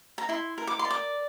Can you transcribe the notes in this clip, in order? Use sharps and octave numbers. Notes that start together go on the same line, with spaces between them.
A#5
E4 C6
A#4
D6
C6
D5
D6